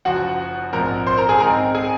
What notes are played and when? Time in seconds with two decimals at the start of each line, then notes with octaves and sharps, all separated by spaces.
0.05 F#1 F#2 F3 F#4 F#5
0.73 A#1 G#2 F3 C4 A#4 A#5
1.07 C5 C6
1.18 A#4 A#5
1.29 G#4 G#5
1.40 G#2 D#3 G#3 C4 A#4 A#5
1.75 G#4 G#5